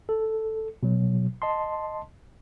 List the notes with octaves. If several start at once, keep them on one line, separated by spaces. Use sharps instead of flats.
A4
B2 F#3
D#5 A5 C6